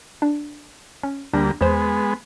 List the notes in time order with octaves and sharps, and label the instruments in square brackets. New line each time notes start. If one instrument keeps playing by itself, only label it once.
[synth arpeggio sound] D4
C#4
[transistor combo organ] D2 G3 A#3 [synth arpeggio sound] D4
[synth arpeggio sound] E2 C5 [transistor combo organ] G#3 B3